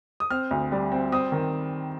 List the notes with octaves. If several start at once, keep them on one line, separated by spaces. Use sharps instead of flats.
D#6
C4 F6
D2
G3
C4
C4 D#6
D#3